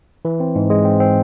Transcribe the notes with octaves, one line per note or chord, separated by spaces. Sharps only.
E3
C4
G#2
G#3
C4
C4